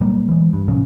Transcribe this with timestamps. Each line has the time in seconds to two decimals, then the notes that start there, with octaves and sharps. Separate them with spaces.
0.01 A#2 F#3 G3 A#3
0.29 E3 G#3
0.53 G2
0.68 A2 C3 F3 C#4